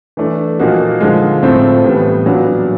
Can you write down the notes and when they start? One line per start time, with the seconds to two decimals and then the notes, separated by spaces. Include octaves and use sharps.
0.17 E3 A3 D4
0.59 A#2 F3 A#3 D#4 F#4
1.00 D3 F3 G#3
1.43 A2 F3 A3 C4
1.84 A2 E3 G3 B3
2.26 A#2 F#3 B3 D4